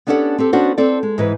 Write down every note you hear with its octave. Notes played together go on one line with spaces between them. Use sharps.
B3 C#4 D4 G4 A4 F#5
C4 G4 A4
B3 C#4 D4 F#4 A4 C5
C4 A4 D5
G#3
G#2 E3 B4